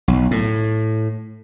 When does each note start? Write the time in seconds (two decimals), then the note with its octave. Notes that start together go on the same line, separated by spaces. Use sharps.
0.08 B1
0.31 A2